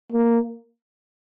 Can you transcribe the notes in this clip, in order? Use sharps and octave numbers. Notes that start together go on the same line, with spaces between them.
A#3